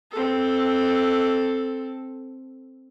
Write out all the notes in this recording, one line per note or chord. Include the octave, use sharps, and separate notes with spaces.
C4 A4